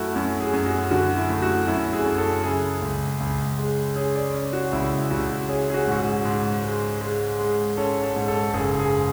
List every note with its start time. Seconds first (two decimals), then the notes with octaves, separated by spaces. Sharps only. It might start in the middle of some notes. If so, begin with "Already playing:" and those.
Already playing: F#2 A3 E4 F#4
0.16 F#2
0.40 G#4
0.53 F#2
0.66 F#4
0.91 D3 F#4
1.17 E4
1.29 A3
1.42 F#4
1.68 F#2 E4
1.93 G#4
2.06 F#2
2.18 A4
2.44 C#3 G#4
2.82 C#2
3.20 C#2
3.59 G#3
3.96 C#4 G#4
4.15 D5
4.34 C#4
4.53 F#4
4.72 C#2 E4
5.11 C#2 F#4
5.49 C#4 G#4
5.70 G#4
5.74 F#4
5.87 G#2 F#4
5.99 G#4
6.25 G#2
6.63 G#3
7.01 G#3
7.39 G#3
7.77 C#4 A4
8.03 A4
8.16 G#2
8.28 A4
8.53 F#1 G#4
8.79 G#4